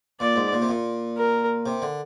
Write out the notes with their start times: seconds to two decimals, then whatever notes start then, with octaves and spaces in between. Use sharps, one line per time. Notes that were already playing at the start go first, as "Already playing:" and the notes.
0.20 A#2 D5
0.36 G#2
0.53 A#2
0.62 C3
0.69 A#2
1.17 A#4
1.66 C3
1.82 D3